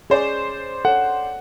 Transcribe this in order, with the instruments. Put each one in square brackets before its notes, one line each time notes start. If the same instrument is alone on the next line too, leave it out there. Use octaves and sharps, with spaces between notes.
[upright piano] C#4 C5 D5 [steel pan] G#4
[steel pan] A4 C#5 [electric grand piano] F#5